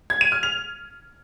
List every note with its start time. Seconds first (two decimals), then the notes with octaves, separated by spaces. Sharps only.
0.10 G#6
0.21 D#7
0.32 F6
0.43 F7